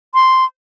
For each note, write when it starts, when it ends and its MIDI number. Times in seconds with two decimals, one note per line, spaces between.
0.14 0.45 84